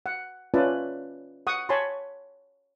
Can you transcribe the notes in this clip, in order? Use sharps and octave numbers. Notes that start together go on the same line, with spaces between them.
F#5
C#4 F4 B4 D5 E5 A5
F#5 C#6 D#6
C#5 G#5 A5 B5 C6